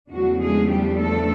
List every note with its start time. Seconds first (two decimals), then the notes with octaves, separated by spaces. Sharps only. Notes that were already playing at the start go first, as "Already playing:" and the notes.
0.12 E2 C#3 F3 F#3 A3 D4 F#4
0.40 G#3 G#4
0.69 G3 G4
0.99 A3 A4